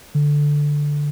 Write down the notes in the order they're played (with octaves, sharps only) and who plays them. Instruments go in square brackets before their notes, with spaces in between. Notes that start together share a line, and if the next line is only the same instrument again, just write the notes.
[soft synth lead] D3